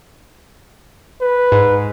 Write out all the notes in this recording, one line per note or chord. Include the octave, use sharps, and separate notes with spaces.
B4
G#2